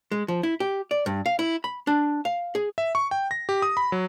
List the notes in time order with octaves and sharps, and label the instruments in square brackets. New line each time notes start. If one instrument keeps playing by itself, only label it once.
[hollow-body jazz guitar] G#3
F3
E4
G4
D5
G2
F5
E4
B5
D4
F5
G#4
[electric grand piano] E5
C#6
G5
A#6
G4
D#6
B5
F#3